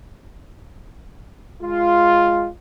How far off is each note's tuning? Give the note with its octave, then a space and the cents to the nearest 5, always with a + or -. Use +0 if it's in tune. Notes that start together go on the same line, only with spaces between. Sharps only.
G#3 +0 F4 +0